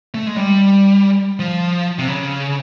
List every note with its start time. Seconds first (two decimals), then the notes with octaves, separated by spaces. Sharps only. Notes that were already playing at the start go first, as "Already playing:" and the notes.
0.14 A3
0.27 G#3
0.38 G3
1.39 F3
1.99 C3
2.08 C#3